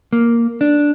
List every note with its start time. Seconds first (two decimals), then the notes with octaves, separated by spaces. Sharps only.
0.13 A#3
0.61 D4